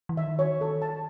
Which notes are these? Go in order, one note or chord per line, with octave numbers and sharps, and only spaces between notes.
E3
D#3 E5
C#5
A4
A5